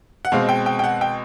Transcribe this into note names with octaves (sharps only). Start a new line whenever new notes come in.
F#5
B2 G#3 C4 F5
G5
G5
G5
F#5
G5